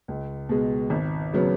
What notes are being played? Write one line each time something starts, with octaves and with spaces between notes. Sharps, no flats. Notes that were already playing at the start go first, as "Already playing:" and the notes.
C#2
B2 G#3
G#1
C#3 F#3 B3